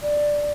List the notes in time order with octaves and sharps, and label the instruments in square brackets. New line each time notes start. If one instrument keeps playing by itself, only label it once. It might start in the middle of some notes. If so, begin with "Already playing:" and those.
[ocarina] D5